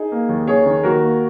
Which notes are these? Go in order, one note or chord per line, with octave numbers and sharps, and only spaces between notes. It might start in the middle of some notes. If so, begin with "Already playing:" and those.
Already playing: D#4 G#4
A#3
D#2
D#3 G#4 C#5
D#3
D#2 F#4 A#4
A#3